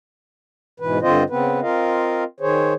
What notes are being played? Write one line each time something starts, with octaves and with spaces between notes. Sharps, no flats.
G#2 B2 E3 B4
G2 D3 C4 F4 C5 D#5
C#3 B3 C4 B4
C4 F4 A#4 D#5 F5
D#3 G#4 C5 C#5